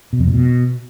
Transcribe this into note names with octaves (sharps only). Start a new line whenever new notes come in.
B2
F2
A2
B2